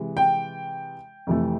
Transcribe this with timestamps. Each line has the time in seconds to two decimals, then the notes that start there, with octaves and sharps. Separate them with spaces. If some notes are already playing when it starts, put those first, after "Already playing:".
Already playing: C3 E3 G#3
0.17 G5
1.27 F2 C3 E3 A3